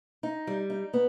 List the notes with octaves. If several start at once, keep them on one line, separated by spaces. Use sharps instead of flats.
D#4
G3
D#4
B3